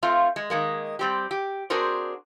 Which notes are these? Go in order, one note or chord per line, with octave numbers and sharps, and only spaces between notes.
A3 C4 F4 F5
G#3
D#3 G#3 A#3
G3 C4 G4
G4
C4 D4 F#4 G#4 A#4 C5